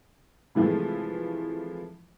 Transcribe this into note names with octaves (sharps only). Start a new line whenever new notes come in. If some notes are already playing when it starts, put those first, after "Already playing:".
C3 E3 F3 G#3 A3